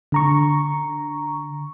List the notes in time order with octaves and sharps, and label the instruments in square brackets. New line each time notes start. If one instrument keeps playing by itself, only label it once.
[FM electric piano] D3 A#5 C#6